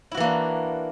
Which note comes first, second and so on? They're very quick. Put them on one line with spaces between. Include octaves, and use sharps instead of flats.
E4 F#4 E3 A#3 D4